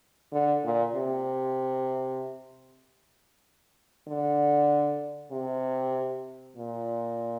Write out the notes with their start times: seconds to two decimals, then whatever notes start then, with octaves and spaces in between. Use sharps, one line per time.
0.32 D3
0.64 A#2
0.95 C3
4.07 D3
5.31 C3
6.57 A#2